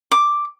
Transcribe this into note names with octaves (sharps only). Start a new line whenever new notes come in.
D6